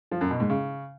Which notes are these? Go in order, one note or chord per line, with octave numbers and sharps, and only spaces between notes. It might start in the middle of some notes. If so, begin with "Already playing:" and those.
F3
F#2
B2
G#2
C#3